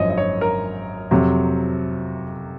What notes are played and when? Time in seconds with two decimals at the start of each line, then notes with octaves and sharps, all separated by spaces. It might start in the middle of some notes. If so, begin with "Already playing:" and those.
Already playing: G#1 F#2 F3 C#5 D#5
0.10 D#5
0.17 C#5
0.41 A#4
1.11 F2 C3 F#3